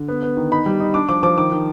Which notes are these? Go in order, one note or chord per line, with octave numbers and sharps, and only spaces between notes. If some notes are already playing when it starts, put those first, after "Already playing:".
Already playing: D3
B3
B3
D#3
D#4 B5
G3
D#4
D4 D6
F3 D6
F3 D6
D#3 D6
D#3